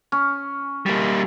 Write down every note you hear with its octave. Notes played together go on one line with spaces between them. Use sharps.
C#4
G3 A#3